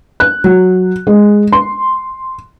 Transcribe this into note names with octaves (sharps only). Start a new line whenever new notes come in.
F#6
F#3
G#3
C6